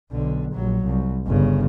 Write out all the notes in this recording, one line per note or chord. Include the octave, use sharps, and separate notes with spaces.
B1 D3
A#1 F#3
C2
G1 C#3